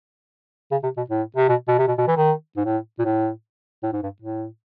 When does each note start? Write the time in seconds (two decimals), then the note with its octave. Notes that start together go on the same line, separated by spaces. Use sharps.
0.71 C#3
0.83 C3
0.97 B2
1.10 A2
1.37 C3
1.49 B2
1.68 B2
1.79 C3
1.88 B2
1.98 B2
2.08 E3
2.17 D#3
2.57 G#2
2.66 A2
2.99 A#2
3.05 A2
3.83 A2
3.93 G#2
4.03 G2
4.22 A2